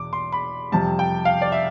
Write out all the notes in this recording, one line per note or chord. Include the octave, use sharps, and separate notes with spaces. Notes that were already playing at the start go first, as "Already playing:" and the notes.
Already playing: E2 B2 D6
C6
B5
F2 C3 G3 A5
G5
F5
D5
E5